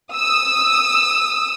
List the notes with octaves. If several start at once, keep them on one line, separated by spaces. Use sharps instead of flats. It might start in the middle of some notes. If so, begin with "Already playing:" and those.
D#6 E6